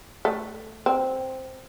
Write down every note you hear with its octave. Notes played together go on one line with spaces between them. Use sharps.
A3
C4